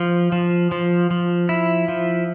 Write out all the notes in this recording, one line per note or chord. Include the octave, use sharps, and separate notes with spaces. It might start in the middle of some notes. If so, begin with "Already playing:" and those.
Already playing: F3
F3
F3
F3
E4
F3